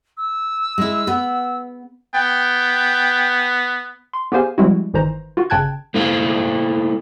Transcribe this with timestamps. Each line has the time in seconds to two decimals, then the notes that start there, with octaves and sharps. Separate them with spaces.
0.17 E6
0.78 G#3 E4
1.07 B3 B4
2.14 B3 G5
4.13 C6
4.32 B3 G4 G#4 C5 F5 G#5
4.58 F3 G3 G#3 C4 E4 F#4
4.94 G1 D#3 E3 C5 A#5
5.37 F4 F#4
5.50 G1 C#3 G5 A5 F#6 G#6
5.94 A3 A#3 E4 C5 F5